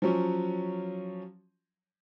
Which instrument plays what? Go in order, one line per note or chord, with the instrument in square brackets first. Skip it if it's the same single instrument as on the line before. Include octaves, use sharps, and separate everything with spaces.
[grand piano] F3 F#3 C#4